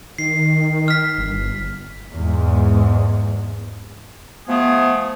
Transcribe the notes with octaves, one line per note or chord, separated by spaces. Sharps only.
D#3 C7
F6 B6
G1
E2 G#2 G#3
F3 A3 B3 G#4